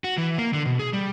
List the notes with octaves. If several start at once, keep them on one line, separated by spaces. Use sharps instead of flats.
F#4
E3
A#3
D3
B2
G#4
G3